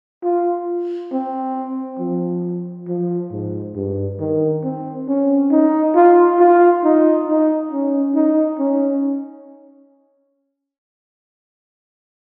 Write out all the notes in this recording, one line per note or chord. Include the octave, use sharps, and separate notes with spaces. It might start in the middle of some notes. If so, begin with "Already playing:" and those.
F4
C4
F3
F3
G#2
G2
D#3
C4
C#4
D#4
F4
F4
D#4
D#4
C#4
D#4
C#4